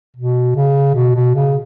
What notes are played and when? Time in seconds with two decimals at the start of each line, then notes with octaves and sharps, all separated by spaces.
0.17 B2
0.56 C#3
0.95 B2
1.15 B2
1.35 C#3